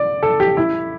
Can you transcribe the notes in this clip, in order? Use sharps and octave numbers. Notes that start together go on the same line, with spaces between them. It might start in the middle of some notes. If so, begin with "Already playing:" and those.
Already playing: D5
A4
G4
E4